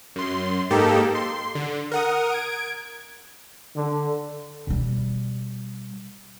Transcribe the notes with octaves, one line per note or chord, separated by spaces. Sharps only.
F#2 C6
G#2 A#3 D#4 G4 A4
C6
D3
A#4 F#5 D#6
G#6 D7
D3
B2 G3